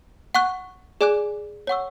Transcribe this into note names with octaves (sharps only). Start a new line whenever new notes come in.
F#5 C#6 F#6
G#4 D5 G#5 D6 F#6
C#5 F#5 C#6 E6